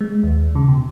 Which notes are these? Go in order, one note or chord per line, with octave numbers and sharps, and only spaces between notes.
G#3
D#2
C#3
B2